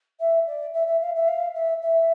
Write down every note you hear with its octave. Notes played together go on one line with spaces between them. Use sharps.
E5
D5
E5
E5
F5
E5
F5
E5
E5